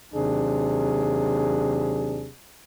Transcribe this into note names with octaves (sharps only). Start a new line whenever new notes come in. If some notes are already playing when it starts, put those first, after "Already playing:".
D#2 C3 F#3 D4 G#4